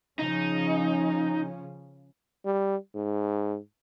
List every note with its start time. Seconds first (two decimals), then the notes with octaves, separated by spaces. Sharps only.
0.19 C#3 F3 C#4 D#4
2.45 G3
2.95 G#2